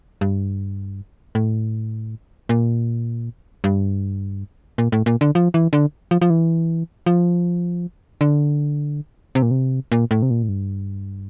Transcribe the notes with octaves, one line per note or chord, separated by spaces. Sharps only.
G2
A2
A#2
G2
A#2
A2
A#2
D3
F3
E3
D3
F3
F3
E3
F3
D3
C3
A#2
C3
A#2
A2
C3
A#2
A2
G2